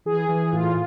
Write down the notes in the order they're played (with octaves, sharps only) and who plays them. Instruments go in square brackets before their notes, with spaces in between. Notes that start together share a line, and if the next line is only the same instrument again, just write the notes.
[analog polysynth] E3 G#4
E3
A2 F4